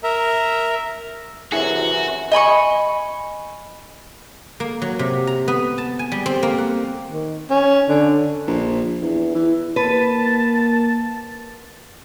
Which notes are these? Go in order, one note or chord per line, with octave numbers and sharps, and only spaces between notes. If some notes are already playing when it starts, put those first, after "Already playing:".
A#4 E5 A#5
F#2 C3 E3 E4 F#4 G#4
D#5 G#5 B5 C#6
A#3
F#3
C3
A#5
B3
A5
G#5
G3
C4
A#3
F#5
D#3
C#4
D3
A#1
E2
E3
A#3 B4 A5